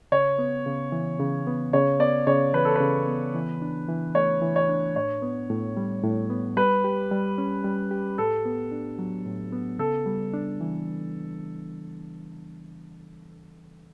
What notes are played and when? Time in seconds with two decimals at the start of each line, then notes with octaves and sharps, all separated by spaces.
0.12 C#3 C#5
0.39 B3
0.66 C#3
0.92 E3
1.19 C#3
1.47 B3
1.73 C#3 C#5
2.00 B3 D5
2.27 C#3 C#5
2.53 E3 B4
2.65 A4
2.76 B4
2.81 C#3
3.07 B3
3.34 E3
3.62 D4
3.89 E3
4.15 A3 C#5
4.42 E3
4.56 C#5
4.69 D4
4.96 A2 C#5
5.22 B3
5.50 A2
5.77 G3
6.03 A2
6.30 B3
6.57 G3 B4
6.84 G4
7.11 G3
7.38 C#4
7.64 G3
7.91 G4
8.18 A2 A4
8.45 B3
8.72 D4
8.98 F#3
9.25 A2
9.52 B3
9.79 C#3 A4
10.06 G3
10.34 D4
10.61 E3